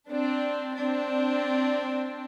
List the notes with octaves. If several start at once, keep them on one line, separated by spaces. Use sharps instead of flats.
C4 D4
C4 D4